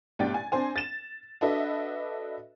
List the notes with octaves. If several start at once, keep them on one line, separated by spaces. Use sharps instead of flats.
A1 G2 B2 D5 G5 A6
G#5
C4 D4 C5 G#5
A6 E7
D4 F#4 A4 B4 D#5 E5